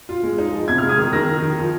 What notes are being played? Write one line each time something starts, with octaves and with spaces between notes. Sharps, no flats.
F4
G#3
D#4
F3
C3 G#6
G#3 F6
D#6 G#6
D#3
D#3 F6 A#6
D#3
D#3
F3